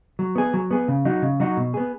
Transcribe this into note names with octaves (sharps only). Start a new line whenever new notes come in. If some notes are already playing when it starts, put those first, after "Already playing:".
F#3
B3 G#4
F#3
B3 G#4
C#3
F#3 D#4 F#4
C#3
F#3 D#4 F#4
B2
B3 G#4